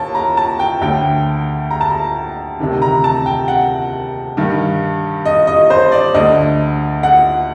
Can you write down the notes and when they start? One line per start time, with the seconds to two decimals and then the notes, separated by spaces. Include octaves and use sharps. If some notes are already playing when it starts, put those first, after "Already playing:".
Already playing: D#2 A5
0.15 A#5
0.37 A5
0.60 G5
0.81 D2 D3 G5
1.71 A#5
1.81 A5
1.91 A#5
2.60 D2 C3 D#3
2.82 A#5
3.04 A5
3.26 G5
3.48 F#5
4.37 G2 D#3
5.25 D#5
5.47 D#5
5.70 C5
5.92 D5
6.14 D2 D3 D#5
7.03 F#5